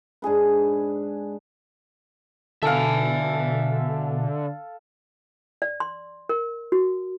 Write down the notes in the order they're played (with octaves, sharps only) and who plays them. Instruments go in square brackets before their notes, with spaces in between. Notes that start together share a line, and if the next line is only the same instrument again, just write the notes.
[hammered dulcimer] G#2 D4 G#4 B4
[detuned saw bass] B2 [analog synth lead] D3 [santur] A4 F5 [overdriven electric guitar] E5 G#5
[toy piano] D5
C6
A#4
F#4